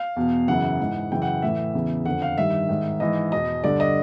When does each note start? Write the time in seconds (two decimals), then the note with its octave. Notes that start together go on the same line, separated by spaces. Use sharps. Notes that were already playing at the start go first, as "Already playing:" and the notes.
Already playing: F5
0.16 E2 B2
0.48 F#2 C#3 E3 F#5
0.80 G#2 E3
1.11 F#2 C#3 E3 G5
1.22 F#5
1.42 A2 E3 E5
1.74 E2 C#3 E3
2.05 F2 D3 F#5
2.22 F5
2.38 G2 D#3 E5
2.69 G#2 D#3
3.00 G#2 E3 D#5
3.32 E2 B2 D#5
3.64 G2 D3 D5
3.80 D#5